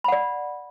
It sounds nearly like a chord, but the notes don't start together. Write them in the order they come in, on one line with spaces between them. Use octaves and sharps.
B5 F#5 D5